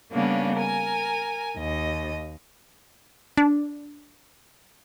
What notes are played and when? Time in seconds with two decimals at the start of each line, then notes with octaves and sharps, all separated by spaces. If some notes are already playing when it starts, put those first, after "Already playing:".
0.12 C#3 G3 A#3 B3 C#4 D4
0.55 A#4 G#5
1.57 D#2 D#5
3.37 D4